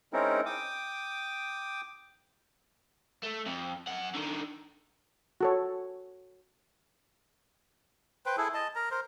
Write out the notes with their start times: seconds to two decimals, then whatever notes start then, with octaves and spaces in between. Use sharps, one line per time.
0.13 G#3 C4 C#4 D#4 E4 A#4
0.46 G5 D6 D#6
3.23 A3
3.46 F2
3.87 F#2 F#5
4.15 D3 D#3
5.41 F#4 A4 C#5
8.26 B4 C5 G5
8.37 E4 G#4 A4
8.54 D#5 A5
8.75 A#4 A#5
8.91 A#4 C5